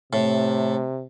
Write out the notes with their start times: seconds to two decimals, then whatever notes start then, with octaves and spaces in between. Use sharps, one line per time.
0.13 A2 C3